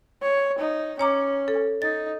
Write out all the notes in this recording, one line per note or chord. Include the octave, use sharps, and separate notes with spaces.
C#5
D#4
C#4 C#5 A#5 D6
A4
D#4 A6